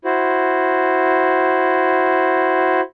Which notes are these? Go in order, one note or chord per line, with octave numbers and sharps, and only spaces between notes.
E4 F#4 C5